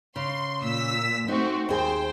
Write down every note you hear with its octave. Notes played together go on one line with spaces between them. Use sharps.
C#3 C6
A#2 E6 B6
A3 C4 D#4 F#4
D#2 G#4 C5 G5